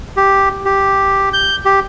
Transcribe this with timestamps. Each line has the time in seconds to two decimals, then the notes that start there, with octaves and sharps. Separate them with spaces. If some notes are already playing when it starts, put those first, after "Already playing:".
0.17 G4
0.65 G4
1.33 G6
1.65 G4